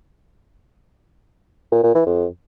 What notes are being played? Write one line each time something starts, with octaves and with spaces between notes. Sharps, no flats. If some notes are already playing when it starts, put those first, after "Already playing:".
A#2
A#2
E3
F2